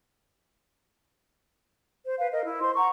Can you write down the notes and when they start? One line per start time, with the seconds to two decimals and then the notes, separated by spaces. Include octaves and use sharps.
2.03 C5
2.18 B4 F5
2.32 A#4 D#5
2.43 E4
2.61 C5 C6
2.76 F#5 A#5 C#6